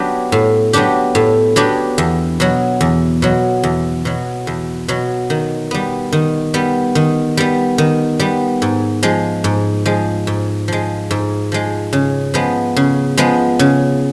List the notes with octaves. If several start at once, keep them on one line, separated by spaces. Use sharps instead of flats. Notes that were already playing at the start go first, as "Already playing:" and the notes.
Already playing: F#3 B3 D4 G4
A2
F#3 B3 D4 G4
A2
F#3 B3 D4 G4
E2
B2 F#3
E2
B2 F#3
E2
B2 F#3
E2
B2 F#3
D#3
G3 B3
D#3
G3 B3
D#3
G3 B3
D#3
G3 B3
G#2
F3 G#3
G#2
F3 G#3
G#2
F3 G#3
G#2
F3 G#3
C#3
F3 G#3 B3
C#3
F3 G#3 B3
C#3